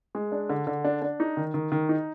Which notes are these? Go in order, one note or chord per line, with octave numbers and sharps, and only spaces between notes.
G#3
D4
D3
D3
D4
D4
D#4
D#3
D#3
D#3
D#4